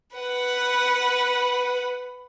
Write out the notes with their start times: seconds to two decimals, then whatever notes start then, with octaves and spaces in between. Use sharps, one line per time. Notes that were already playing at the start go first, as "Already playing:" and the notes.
0.15 B4 F#5